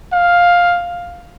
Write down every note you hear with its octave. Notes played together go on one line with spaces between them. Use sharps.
F5